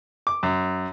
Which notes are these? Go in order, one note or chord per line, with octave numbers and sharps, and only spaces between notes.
D6
F#2